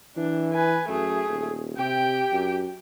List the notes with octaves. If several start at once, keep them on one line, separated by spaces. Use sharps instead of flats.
E3 D4
B4 G#5
F#2 A3 G#4
D#1
C3 G4 G5
F#2